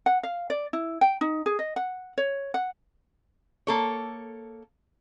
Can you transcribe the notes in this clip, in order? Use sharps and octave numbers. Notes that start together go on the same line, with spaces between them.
F#5
F5
D5
E4
G5
D#4
G#4
D#5
F#5
C#5
F#5
A#3 A4 C#5